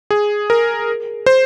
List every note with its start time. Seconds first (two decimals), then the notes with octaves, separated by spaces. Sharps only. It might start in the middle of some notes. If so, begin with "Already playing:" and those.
0.11 G#4
0.50 A#4
1.26 C5